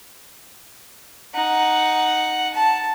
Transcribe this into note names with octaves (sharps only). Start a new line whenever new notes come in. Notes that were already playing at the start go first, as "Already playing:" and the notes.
D#4 F#5
A5